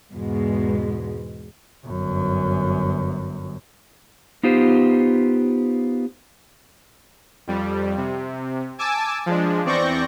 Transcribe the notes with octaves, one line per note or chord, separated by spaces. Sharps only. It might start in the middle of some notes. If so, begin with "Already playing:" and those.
E2 G#2 B2 G#3
G1 F#2
B3 D#4 F4 G4 C5
F2 G3
C3
G#5 A5 D6 E6
F3 G#3 D4
E2 C4 D5 C#6 G6 A#6